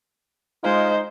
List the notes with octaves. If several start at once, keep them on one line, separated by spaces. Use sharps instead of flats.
G#3 D#4 F4 C5